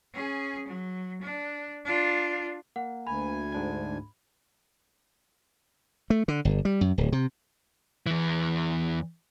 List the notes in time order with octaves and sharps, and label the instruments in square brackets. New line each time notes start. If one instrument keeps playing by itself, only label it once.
[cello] C#4 G#4
F#3
D4
D4 F4
[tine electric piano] A#3 [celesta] F#5
[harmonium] D2 G#5 [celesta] B5
[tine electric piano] G#2 D4 G#6
[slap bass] A3
D3
G1
G3
F#2
D1
C3
[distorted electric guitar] E2 E3